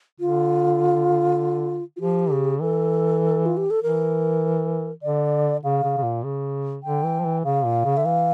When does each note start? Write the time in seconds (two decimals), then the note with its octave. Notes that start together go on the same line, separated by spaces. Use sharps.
0.20 D3 F4
1.97 F4
2.01 F3 G4
2.31 C#3
2.61 E3 A4
3.46 F4
3.57 G4
3.70 A4
3.83 E3 A#4
5.03 D3 D5
5.63 C#3 F5
5.84 C#3
5.97 C#3
6.03 A#2
6.24 C#3
6.84 D3 G5
7.04 E3
7.20 F3
7.24 E3
7.45 C#3 F5
7.65 A#2
7.85 C#3
7.97 D3 E5
8.05 E3 F5